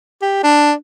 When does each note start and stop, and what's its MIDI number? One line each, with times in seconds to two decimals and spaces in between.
0.22 0.39 67
0.43 0.73 62